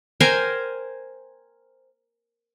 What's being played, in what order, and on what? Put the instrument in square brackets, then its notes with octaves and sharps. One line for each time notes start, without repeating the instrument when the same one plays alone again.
[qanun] A#4 C5 G5 G#5